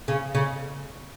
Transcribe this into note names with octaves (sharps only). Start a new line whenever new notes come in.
C#3
C#3